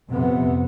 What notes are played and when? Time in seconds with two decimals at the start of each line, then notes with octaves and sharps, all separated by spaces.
0.10 F2 C3 B3